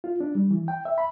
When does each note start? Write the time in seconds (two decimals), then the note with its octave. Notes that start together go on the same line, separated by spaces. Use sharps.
0.04 F4
0.20 D4
0.35 G3
0.51 E3
0.68 G5
0.85 E5
0.98 B5